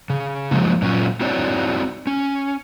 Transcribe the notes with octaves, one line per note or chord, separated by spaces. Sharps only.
C#3
F3 F#3 G#3 A#3 D#4
A#2 F#3 C#4 F4
C4 D#4 E4 F#4 C#5 D5
C#4